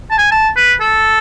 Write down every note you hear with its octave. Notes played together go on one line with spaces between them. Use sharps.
A5
G#5
A5
B4
A4